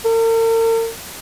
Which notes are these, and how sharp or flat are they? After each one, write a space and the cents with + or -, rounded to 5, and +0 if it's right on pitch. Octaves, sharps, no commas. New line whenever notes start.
A#4 -45